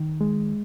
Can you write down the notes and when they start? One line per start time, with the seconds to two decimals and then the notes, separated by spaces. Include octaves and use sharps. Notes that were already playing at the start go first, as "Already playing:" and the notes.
Already playing: D#3
0.21 G#3